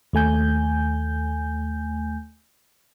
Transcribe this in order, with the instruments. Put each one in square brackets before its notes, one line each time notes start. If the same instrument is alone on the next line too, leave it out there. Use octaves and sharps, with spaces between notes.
[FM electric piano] D#2 A3 G#5 G6